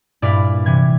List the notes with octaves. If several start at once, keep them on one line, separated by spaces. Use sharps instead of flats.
G2 A#2 E4 B4 D5 F6
C3 E3 G#6